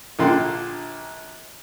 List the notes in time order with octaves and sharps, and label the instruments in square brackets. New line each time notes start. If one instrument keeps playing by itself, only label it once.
[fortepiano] A#1 A#2 D3 G5 C6